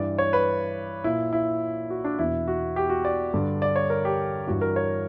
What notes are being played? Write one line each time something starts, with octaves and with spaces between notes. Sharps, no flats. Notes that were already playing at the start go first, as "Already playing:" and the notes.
Already playing: G2 E3 D5
C#5
B4
A#2 E4
E4
F#4
D4
E2 B2 E4
F#4
G4
F#4
D5
G2 D3
D5
C#5
A#4
G4
G2 E3 F#4
A#4
C#5